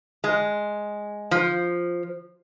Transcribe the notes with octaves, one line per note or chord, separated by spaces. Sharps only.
G#3
F3